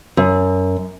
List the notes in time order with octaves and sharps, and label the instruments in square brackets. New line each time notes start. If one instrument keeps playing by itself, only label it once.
[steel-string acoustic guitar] F#2